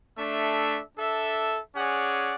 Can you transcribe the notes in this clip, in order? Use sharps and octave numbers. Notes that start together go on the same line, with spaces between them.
A3 D4 A4 E5
D4 A4 E5
C#4 G#4 D5 F#5